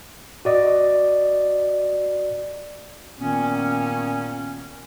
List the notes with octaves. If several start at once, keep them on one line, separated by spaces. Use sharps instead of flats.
F#4 D5 D#5
A#2 D#3 A#3 B3 C#4